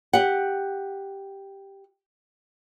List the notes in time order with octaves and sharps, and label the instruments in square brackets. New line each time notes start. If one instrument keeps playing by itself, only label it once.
[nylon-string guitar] G4 F#5